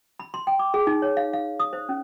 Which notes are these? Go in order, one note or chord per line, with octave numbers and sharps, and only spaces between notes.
B5
C6
G5
D6
G#4
D#4
C#5
F5
F5
D#6
C5
C#4